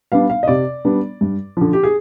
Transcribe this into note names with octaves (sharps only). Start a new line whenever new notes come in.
G3 B3 D4 F5
F5
D#5
C3 D5
G3 B3 D4
G2
D3 F3
G4
G#4